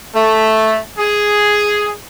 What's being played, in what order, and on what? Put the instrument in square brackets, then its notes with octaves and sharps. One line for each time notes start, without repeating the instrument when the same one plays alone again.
[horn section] A3
G#4